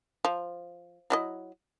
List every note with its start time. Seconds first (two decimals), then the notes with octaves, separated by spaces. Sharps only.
0.25 F3
1.10 F#3 E4 D#5